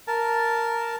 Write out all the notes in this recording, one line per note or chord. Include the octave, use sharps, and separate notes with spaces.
A#4 A5